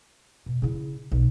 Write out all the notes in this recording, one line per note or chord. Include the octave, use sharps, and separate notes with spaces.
B2
C#3 E4
B1